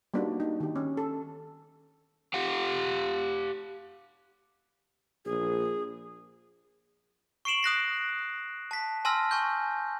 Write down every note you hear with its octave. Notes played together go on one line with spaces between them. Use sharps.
G3 A#3 B3 D4 D#4 F#4
D#4
D#3 G4
C#4
A4
G4 F5 F#5
A#1 G#4
C#6 C7 D7 E7 F#7
D#6 F#6 A#6 C7
A5 B6
G#5 A5 C6 E6 F6 A#6
G#5 C#6 G6